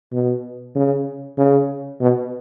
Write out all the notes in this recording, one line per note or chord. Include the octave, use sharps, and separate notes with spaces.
B2
C#3
C#3
B2